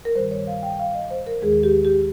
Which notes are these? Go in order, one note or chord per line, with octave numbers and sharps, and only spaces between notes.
A#4
G2 D#3 G3 C5
C#5
F5
G5
F5
D#5
C5
A#4
D#2 D#3 G#3 G#4
G4
G4